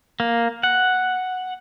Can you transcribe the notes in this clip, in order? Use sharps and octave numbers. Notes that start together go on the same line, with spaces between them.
A#3
F#5